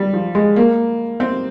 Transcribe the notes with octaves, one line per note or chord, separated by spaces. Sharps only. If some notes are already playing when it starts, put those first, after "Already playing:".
Already playing: G3
F3
G#3
A#3
C4